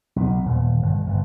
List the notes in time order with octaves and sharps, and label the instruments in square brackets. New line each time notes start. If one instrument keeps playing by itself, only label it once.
[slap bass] B1
D#1
G1
G1